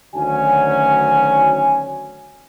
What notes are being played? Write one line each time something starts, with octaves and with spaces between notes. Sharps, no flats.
D2 D#3 F#3 C#4 F#4 G#5